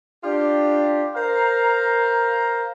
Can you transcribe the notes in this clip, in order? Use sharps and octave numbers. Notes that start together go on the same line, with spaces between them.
D4 F4 G4
A#4 C5 F5 A#5